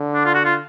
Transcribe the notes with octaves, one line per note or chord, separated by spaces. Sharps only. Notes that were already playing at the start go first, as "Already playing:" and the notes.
Already playing: D3
D4
F4
F#4
F4